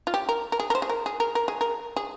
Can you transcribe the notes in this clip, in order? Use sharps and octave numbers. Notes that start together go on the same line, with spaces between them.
F4
G4
A#4
A#4
G#4
A#4
C5
G#4
A#4
G#4
A#4
A#4
G#4
A#4
G#4